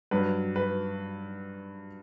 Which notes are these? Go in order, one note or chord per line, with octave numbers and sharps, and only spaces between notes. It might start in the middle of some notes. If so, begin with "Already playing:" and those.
G2 F#3 B4
B4